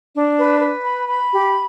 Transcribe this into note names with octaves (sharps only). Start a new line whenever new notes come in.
D4
B4
B4
B5
B5
G4